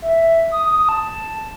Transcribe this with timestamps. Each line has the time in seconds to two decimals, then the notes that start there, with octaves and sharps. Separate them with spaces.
0.02 E5
0.52 D#6
0.89 A5
1.12 A5